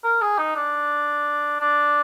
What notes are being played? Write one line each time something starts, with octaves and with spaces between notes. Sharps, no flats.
A#4
G#4
D#4
D4
D4